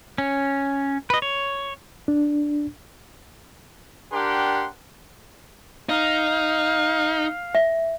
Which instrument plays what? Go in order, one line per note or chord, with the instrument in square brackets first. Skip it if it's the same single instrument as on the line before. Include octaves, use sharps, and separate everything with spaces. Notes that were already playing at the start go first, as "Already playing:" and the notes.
[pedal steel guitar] C#4
B4 D#5
C#5
[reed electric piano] D4
[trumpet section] D4 G4 A#4 F#5 G5 C6
[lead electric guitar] D#4 [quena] F5
[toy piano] E5